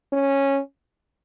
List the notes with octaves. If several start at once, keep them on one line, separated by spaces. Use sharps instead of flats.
C#4